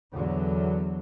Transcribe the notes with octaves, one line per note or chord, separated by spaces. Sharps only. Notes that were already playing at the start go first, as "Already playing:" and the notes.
E2 D3 F#3